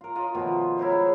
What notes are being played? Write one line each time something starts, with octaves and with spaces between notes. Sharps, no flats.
F4 A#4
F4 D#5
B2 D#3 F3 A3
E4 A#4 C5 C#5
G#3